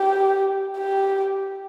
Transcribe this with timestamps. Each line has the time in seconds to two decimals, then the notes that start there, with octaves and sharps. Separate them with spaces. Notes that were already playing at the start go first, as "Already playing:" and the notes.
Already playing: G4
0.78 G4